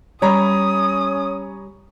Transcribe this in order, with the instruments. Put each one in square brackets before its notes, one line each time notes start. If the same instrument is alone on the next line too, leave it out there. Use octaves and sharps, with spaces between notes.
[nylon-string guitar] G3 [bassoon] C#4 [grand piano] C#5 A#5 B5 [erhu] D#6